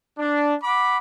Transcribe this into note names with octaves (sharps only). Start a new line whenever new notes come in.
D4
F#5 B5 D6